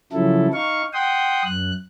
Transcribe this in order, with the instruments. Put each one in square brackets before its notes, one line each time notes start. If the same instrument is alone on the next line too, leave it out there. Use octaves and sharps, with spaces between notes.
[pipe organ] C#3 F3 F#3 E4 A4
D#4 F5 C#6
F#5 G5 C6 D#6
F#2 F#6